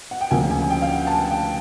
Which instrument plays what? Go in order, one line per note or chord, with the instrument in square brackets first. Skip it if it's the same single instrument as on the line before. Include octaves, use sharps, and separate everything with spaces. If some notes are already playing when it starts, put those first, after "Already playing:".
[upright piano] F#5
G5
D2 C#3 F3 A#3 G#5
G#5
G#5
G5
F5
F#5
A5
G#5
G5